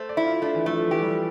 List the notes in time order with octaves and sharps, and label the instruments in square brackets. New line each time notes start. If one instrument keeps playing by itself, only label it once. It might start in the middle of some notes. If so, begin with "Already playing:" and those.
Already playing: [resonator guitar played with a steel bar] A3 [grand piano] C5
[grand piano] D5
[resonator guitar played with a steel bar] E4
[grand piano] F4
[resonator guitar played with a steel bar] A3 [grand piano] D4
[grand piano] E3
[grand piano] F3 [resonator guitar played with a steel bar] A3
[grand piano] F3
[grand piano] E3 [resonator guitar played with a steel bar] G4
[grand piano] G3
F3